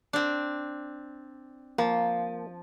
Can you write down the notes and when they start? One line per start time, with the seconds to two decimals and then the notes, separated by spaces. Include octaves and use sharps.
0.13 C4 D4
1.78 F3 A#3